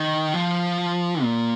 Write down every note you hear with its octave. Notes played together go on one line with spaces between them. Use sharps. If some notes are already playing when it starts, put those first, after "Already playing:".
Already playing: D#3
F3
A#2